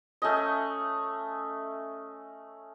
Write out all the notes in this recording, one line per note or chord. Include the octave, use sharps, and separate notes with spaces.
A3 C#4 D#5